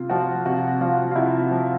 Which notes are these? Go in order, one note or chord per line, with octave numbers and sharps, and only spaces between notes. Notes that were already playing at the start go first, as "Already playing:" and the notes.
Already playing: C3 F4
F3 F#4
C3 F#4
F3 F4
F4
C3 E4
F3